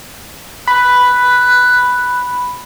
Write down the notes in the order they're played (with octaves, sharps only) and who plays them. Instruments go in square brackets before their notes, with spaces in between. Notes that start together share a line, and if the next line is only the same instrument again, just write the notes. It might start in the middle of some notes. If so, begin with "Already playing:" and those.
[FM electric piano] B5 [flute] F#6